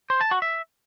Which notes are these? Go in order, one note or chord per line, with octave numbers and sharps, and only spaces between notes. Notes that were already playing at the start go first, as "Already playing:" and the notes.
C5
A5
F#4
E5